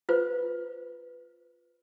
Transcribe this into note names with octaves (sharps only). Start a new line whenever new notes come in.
F4 B4 C5